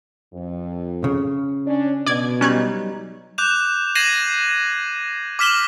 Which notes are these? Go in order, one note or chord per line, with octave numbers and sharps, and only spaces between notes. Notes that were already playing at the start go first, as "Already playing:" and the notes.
F2
C#3
C#4 D4
B2 D5 G#6
F#3 G3 C#4 D#4 F#6 G#6
D6 F#6 G6 E7 F7
G#6 A#6 C7 D#7 E7 F#7
D6 F6 B6 E7 F#7 G7